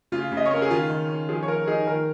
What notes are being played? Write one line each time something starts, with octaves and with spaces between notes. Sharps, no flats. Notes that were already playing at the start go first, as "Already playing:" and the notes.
C#3 F4
C#3
D#5
C#5
C#4 A#4
G#4
D#3 F4
D#3
C#4
F3 G#4
C#5
F3 A#4
D#4 G#4
D#3 A#4